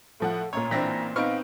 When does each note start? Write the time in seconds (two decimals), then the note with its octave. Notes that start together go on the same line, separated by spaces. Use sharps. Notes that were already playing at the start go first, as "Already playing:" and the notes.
0.20 A2 F3 A4 F#5
0.53 A1 A#2 C#5 A#5
0.71 E3 C4 D4 E4 A#6 B6
1.16 B3 C4 D#4 F5 C#6 F6 D7